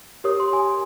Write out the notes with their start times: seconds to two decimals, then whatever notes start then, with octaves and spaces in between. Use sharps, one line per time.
0.24 G4 A#4 C#5 D#6
0.40 C6
0.53 G#5